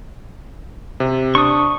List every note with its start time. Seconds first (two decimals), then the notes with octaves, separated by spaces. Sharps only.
1.00 C3
1.35 D4 C#6 D#6